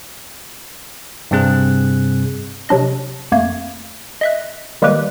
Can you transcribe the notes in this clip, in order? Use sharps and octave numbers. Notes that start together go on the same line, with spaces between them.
G2 C3 G3 C4 G#4 F#6
C3 F#3 D4 D#5
F2 A3 A#3 G#6
D#5 E5 F#6
D#3 G3 G#3 A#3 G4 B4